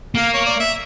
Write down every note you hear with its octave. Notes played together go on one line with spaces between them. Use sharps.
A#3 F5
C#5
D5
E5